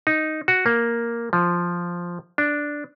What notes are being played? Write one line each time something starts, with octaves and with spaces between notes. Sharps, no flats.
D#4
F#4
A#3
F3
D4